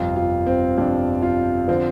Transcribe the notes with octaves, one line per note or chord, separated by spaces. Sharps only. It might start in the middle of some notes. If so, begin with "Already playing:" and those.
Already playing: G1 F2 C3 F4
F4
C4
G1 F2 C3 D4
F4
D3 F3 C4